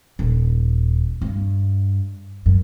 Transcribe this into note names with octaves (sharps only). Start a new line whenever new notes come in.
D#1
G2
F#2